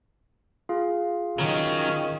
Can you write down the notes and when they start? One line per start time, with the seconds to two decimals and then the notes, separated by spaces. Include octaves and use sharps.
0.69 F4 G#4 F5
1.39 D#3 F#3 C#4